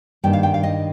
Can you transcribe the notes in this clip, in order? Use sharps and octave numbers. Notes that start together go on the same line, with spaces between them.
G2 D#3 A#3 G5
F5
G5
F5
D#5